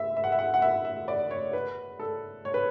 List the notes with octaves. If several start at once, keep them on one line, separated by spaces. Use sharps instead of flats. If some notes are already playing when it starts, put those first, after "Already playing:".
Already playing: E5
E5
F#5
E5
F#5
F#5
E5
E5
D5
C#5
B4
A4
C#5
B4